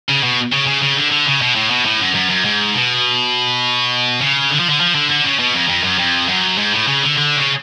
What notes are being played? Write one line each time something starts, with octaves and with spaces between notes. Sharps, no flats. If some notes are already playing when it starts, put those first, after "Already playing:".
C#3
B2
C#3
C#3
C#3
D3
D3
C#3
B2
A2
B2
A2
F#2
F#2
F#2
G#2
B2
C#3
D3
F3
D3
F3
D3
D3
C#3
B2
F2
F2
F#2
F2
F#2
G#2
A2
C#3
D3
D3
C#3